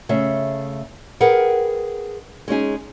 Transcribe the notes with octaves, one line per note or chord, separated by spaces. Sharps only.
C#3 A3 E5
G#4 A#4 B4 F#5 G5
G#3 C#4 D#4 G#4